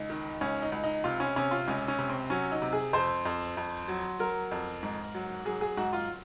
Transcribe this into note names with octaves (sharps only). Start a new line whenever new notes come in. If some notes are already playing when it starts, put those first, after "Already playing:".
Already playing: C#2 D#4
D#3
C#2 C#4
D#4
C#2
D#4
C3 F4
C#4
C3 C#4
F4
C#2 C#4
C#4
C3
C4
F#3 C#4
D#4
C3
G#4
F2 C5
F2
F2
F#3
F#3 A#4
F2
G#2
F#3
F#3 G#4
G#4
G#2 F#4
F4